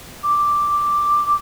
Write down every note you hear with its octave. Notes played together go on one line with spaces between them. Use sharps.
D6